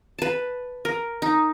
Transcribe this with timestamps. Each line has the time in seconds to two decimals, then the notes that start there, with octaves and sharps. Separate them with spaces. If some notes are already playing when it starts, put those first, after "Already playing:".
0.19 B4 A5
0.85 A#4
1.22 D#4